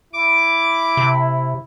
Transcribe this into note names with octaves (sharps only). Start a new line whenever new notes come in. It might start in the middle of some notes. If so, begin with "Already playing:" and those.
E4 D6
C3